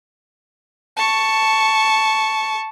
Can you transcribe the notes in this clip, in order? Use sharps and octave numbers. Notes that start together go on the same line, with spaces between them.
A5 C#6